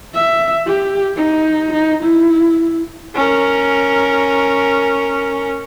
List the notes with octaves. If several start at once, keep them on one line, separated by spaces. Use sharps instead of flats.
E5
G4
D#4
D#4
E4
C#4 A#4